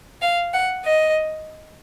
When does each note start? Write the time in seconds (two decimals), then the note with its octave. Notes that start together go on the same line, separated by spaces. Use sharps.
0.22 F5
0.53 F#5
0.84 D#5